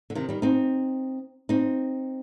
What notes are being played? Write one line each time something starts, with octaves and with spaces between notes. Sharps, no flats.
D3
C3 D#3
D#3 G3
C4 D#4
C4 D#4